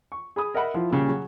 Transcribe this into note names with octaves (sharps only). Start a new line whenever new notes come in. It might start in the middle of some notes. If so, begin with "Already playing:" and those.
C#6
G#4 B5 D#6
A#4 D#5 E5 F#5 B5
F3 E4 F4
A#2 C#3 G3
F#3 F#4 G#4